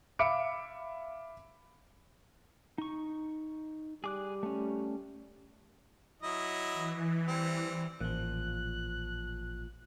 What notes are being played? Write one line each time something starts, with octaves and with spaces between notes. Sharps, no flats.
E5 F5 B5 D6 C#7 D7
D#4 C#6
G3 G#4 D6 F#6
A3 C#4
F#3 E4 D#5
E3
G3 C4
A1 A#2 F3 F#6